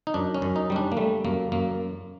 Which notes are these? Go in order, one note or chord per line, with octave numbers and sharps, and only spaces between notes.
D#4
F#2 D4
C#4
F#2
D#4
G3 C#4
D4
A#3
G3 A3
F#2 A#3
F#2 A#3